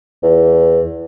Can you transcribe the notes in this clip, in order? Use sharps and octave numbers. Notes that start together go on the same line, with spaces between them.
E2